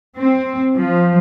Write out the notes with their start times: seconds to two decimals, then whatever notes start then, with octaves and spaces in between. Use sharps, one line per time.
0.17 C4
0.75 F3